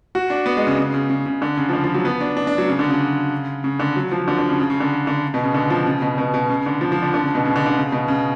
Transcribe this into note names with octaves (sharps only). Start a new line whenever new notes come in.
F#4
D4
B3
G#3
C#3
C#3
C#3
C#3
C#3
D3
C#3
F3
D3
F3
F#3
B3
D4
D4
D4
F#3
C#3
D3
C#3
C#3
D3
F#3
F3
D3
D3
C#3
C#3
C#3
D3
D3
B2
C#3
D3
F3
C#3
B2
B2
B2
C#3
D3
F3
F3
D3
D3
C#3
B2
C#3
D3
D3
C#3
B2
C#3